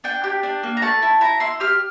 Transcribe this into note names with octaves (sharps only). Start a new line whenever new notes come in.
D4 G5
G4
D4
A#3
A#5
A3 A5
E4
E4 A#5
E4 C6
G4 F6